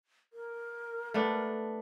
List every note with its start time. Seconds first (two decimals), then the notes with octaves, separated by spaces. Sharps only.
0.33 A#4
1.14 A3 B3 D4